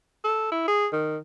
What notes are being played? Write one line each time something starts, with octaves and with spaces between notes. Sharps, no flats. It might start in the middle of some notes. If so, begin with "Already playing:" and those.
A4
E4
G#4
D#3